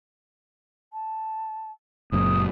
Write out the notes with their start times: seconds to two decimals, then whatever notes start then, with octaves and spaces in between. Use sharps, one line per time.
0.93 A5
2.12 F#1 F#2 A#2 D#6